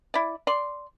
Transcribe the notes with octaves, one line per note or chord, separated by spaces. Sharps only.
E4 D5
D5 C6